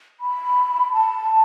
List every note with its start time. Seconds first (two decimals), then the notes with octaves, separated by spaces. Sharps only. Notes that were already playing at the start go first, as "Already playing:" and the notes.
0.21 B5
0.93 A5